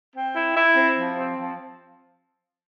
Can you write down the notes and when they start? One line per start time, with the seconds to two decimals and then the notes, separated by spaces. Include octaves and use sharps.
0.14 C4
0.35 E4
0.55 E4
0.76 C4
0.96 F3
1.17 C4
1.38 F3